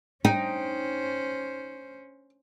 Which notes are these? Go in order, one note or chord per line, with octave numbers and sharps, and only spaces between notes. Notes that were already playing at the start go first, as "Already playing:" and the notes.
C#4 D#4 C5 G5